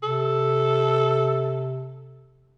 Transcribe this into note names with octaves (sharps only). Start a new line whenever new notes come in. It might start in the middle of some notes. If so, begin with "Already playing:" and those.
C3 A4